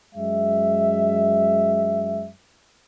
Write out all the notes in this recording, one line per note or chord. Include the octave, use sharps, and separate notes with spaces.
F#2 G#3 E5